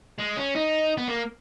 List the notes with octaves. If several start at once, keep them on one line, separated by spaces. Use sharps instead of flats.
G#3
C#4
D#4
B3
A#3